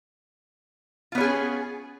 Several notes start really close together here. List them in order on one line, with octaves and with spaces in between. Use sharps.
F4 B3 C#5 G#4 C#4